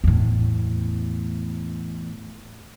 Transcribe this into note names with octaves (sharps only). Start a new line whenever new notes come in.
E2 A2